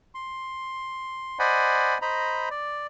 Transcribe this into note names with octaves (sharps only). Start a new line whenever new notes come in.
C6
C5 D5 D#5 F#5 G#5 B5
C5 D#5 A#5 B5
D5